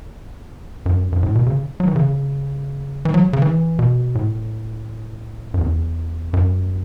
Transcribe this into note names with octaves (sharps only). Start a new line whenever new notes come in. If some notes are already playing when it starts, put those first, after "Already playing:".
F#2
F#2
A2
B2
C#3
F#3
E3
C#3
E3
F#3
C#3
E3
B2
A2
F#2
E2
F#2